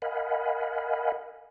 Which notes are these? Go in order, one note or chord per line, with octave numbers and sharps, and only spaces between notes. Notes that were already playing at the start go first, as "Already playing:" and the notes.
A#4 D#5 F5 F#5 G#5 B5